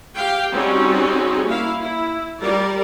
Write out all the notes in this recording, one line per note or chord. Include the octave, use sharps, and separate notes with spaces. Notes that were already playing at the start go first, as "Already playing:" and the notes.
G4 F5 G5
G3 C4 C#4 D#4 F#4 G#4
A#3 E4 F5
E4
G3 A#4 D5